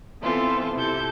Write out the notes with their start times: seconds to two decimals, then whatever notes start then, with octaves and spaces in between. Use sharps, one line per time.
0.22 E3 B3 C4 F4 A4
0.74 C3 E4 A4 G6